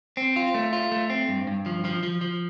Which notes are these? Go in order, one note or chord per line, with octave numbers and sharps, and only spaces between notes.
C4
F4
A3
F4
A3
C4
G2
G2
F3
F3
F3
F3